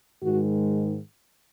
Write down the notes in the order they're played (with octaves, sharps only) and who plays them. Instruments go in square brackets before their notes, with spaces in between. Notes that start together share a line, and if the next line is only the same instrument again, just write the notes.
[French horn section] G#2 D#3 G#3 F#4